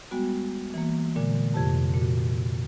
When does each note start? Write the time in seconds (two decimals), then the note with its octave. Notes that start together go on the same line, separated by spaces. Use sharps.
0.11 G3 G#3 B3 F#4
0.74 E3 A#3
1.16 A#2 D3 G#3
1.54 F2 C3 G4 A5
1.94 A#2 F#4